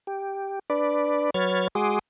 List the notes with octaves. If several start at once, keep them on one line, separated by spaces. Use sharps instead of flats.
G4
D4 B4 D5
F#3 B4 C#5 F6 G#6 A6
G#3 F#4 G#4 C6 D6 D#6